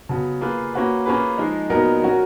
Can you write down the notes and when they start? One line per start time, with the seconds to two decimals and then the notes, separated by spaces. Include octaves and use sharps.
0.09 C#3 F#3 B3
0.41 A#3 F4 G#4 B4
0.74 A#3 C#4 F#4 B4
1.06 A#3 C#4 F4 G#4 B4
1.38 F3 G#3 D#4
1.70 A#2 F#3 B3 D#4 A#4
2.02 F#3 C#4 F#4 A#4